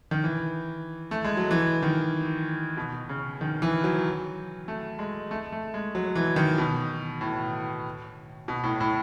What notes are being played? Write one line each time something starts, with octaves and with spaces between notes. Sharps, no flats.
D#3
E3
A3
G#3
F#3
E3
D#3
B2
C#3
D#3
E3
F#3
A3
G#3
A3
A3
G#3
F#3
E3
D#3
B2
A2
B2
A2
A2